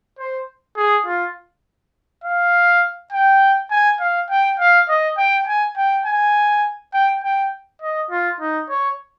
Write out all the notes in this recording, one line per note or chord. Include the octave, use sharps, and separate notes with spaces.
C5
G#4
F4
F5
G5
G#5
F5
G5
F5
D#5
G5
G#5
G5
G#5
G5
G5
D#5
F4
D#4
C#5